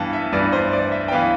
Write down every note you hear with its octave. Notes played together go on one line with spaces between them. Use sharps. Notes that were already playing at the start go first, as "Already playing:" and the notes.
Already playing: G2 E3 B3 F5 G5 A5
E5
G2 E3 B3 D5
C5
D5
E5
G5
E3 B3 F5